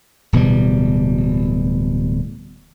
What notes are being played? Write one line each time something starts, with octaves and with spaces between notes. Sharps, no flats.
D1 B2 E3 G3